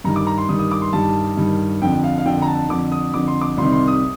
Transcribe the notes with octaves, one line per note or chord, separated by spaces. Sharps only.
G2 D#3 A#5
D6
A#5
C6
G2 D#3 D#6
D#6
D6
C6
G2 D#3 A5
G2 D#3
F2 D3 G5
F5
F5
F2 D3 G5
A#5
A5
F2 D3 D6
D#6
F2 D3 D6
C6
D6
C2 C3 D#3 C6
C6
D#6